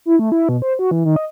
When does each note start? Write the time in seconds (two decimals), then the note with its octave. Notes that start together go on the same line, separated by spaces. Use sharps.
0.06 E4
0.19 A3
0.32 E4
0.49 B2
0.62 C5
0.79 F#4
0.91 E3
1.05 D#3
1.16 D#5